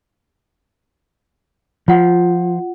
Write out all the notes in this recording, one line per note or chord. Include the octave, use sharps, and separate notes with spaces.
F3 F4 F#5